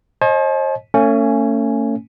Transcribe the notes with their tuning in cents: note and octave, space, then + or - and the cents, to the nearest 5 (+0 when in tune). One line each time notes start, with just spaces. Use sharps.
C5 +45 D#5 +0 A5 -45
A3 +40 C#4 +0 G#5 +0